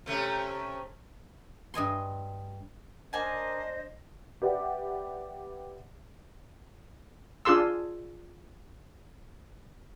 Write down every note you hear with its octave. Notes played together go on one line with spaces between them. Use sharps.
C3 A3 C#4
G2 D#5 G#5 C6
A#3 D4 C5 D#5 G#5 A5
G4 B4 D5 E5 F#5
D4 F4 G#4 C6 E6